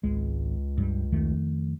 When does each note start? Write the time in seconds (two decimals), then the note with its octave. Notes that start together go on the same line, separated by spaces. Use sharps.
0.03 G#1 C#2 G#3
0.78 G2 G3
1.12 F2 D#3 A3